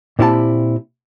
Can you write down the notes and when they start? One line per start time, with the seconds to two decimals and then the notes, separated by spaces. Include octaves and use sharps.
0.19 A#2 C4 E4 G4 G#4 A5